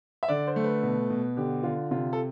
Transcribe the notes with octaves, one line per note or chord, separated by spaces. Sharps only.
E5
D3 D5
C5
A3
B4
B2
B2
D3 G4
D3 F4
C3 F4
A4